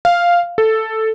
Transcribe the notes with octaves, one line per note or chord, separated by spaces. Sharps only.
F5
A4